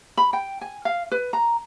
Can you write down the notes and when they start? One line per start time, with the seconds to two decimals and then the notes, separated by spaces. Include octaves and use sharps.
0.17 B5
0.33 G5
0.61 G#5
0.85 F5
1.12 B4
1.33 A#5